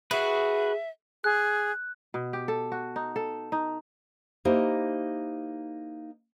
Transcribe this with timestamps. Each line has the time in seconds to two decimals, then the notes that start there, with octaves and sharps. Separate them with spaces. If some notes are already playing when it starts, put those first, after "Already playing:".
0.11 F#4 G#4 B4 E5
1.24 G#4 F#6
2.14 B2
2.33 G4
2.48 A4
2.72 F#4
2.96 D#4
3.16 A4
3.52 D#4
4.45 A#3 D#4 E4 G4 C5